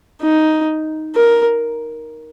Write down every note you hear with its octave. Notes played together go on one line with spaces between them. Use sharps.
D#4
A#4